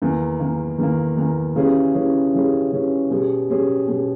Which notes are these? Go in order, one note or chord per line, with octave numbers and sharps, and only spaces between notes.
E2 D#3 A#3
E2 D#3 A#3
E2 D#3 A#3
E2 D#3 A#3
C#3 E3 G3 C#4 G#4
C#3 E3 G3 C#4 G#4
C#3 E3 G3 C#4 G#4
C#3 E3 G3 C#4 G#4
B2 G3 C#4 G#4
B2 G3 C#4 G#4
B2 G3 C#4 G#4